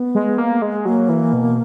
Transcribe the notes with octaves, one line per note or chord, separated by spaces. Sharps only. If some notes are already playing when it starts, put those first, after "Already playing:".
Already playing: B3
G#3
A#3
G#3
F#3 A#3
E3
B2